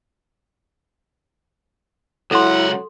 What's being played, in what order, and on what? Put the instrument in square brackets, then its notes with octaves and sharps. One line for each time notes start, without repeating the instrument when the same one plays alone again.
[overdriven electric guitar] C#2 F#5 [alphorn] F#3 [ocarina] E4 [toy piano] A4 C6